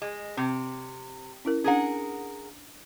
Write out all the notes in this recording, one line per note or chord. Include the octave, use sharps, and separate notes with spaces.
G#3
C3 C4
C#4 E4 A#4
C#4 D4 G#4 A#4 F#5